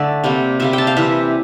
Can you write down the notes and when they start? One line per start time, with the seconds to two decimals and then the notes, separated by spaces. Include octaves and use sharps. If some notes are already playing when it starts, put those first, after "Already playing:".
Already playing: D3 A3 D5 E5
0.24 C3 G3 A#3
0.60 C3 G3 A#3 E5
0.73 G5 A5
0.87 F5
0.97 C3 E3 G3 E5